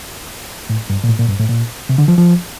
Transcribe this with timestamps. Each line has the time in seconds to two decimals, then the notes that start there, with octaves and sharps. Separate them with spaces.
0.70 A2
0.90 G2
1.04 A#2
1.09 A2
1.19 A#2
1.29 G2
1.40 A2
1.49 A#2
1.89 C3
1.98 D3
2.08 F3
2.18 F3